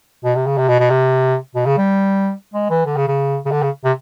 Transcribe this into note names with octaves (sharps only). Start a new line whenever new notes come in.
B2
C3
C#3
C3
B2
B2
C3
B2
C#3
G3
G#3
E3
D3
C#3
C#3
C#3
D3
C#3
C3